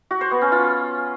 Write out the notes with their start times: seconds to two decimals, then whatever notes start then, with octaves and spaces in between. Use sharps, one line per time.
0.11 F#4
0.21 C5
0.31 B3
0.42 C#4
0.52 F4